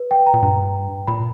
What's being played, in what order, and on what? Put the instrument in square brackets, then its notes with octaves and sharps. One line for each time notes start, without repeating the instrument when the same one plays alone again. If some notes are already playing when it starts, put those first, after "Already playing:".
Already playing: [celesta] B4
G5
A#5
[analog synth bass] A#2
[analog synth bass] G2 [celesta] A#5
[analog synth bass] A#2 [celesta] B5